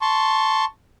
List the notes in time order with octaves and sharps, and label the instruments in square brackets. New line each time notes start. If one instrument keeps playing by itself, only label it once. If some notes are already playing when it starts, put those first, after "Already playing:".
[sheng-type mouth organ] A5 C6 C#6